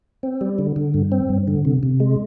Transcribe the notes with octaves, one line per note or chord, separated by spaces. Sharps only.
C4
G3
D3
D3
G2
C4
G2
D3
C3
C3
G#3